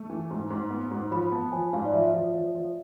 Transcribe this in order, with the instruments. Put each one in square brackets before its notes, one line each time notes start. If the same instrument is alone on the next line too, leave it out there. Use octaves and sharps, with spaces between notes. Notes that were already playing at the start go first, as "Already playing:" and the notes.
Already playing: [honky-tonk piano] A3
E3
G#2
G#2
B3
G#2
[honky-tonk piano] F3 [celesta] B5
[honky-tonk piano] B3 [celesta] A5
[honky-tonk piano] F3 [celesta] G#5
[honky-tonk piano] G#2 [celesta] F5
[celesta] D5
[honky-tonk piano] F3 [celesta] E5
[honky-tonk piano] F3
F3
F3